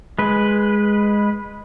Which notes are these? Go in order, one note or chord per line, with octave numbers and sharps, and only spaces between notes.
G#3 B4